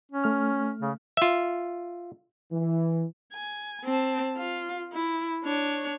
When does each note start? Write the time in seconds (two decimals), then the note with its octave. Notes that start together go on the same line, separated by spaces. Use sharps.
0.12 C#4
0.24 A3 F6
0.82 C#3
1.17 F4 E5
2.53 E3
3.33 G#5
3.85 C4 A5
4.37 F4
4.93 E4
5.44 D4 C#5